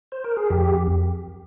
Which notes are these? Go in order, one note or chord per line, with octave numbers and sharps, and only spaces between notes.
C5
A#4
G#4
F2 G4